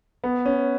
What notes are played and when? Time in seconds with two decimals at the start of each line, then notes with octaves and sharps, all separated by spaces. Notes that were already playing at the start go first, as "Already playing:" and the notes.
0.24 B3
0.46 C#4